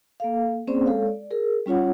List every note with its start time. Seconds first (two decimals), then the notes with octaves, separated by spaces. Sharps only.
0.20 A#3 A4 F5
0.67 A#3 C4 C#4 G#4 C5 D5
0.86 G#3 A4 C#5 F5
1.06 D5
1.31 G#4 A#4
1.66 G3 C#4 F4 C#5 F#5